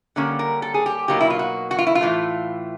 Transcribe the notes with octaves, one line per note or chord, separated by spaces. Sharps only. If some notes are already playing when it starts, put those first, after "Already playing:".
D3 G3 A#3 C#4
A#4
A4
G#4
G4
B2 F#3 A#3 D#4 G4
E4
F4
F#4
F#4
F4
E4
F4
A2 E3 A3